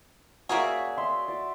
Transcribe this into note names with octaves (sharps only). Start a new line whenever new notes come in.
A#3 C#4 F#4 G#4 D5 E5
E5 C6
D5